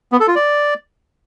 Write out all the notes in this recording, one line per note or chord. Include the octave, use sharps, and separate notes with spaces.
B3
A4
F4
D5